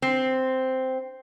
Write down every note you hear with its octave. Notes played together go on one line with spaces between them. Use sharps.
C4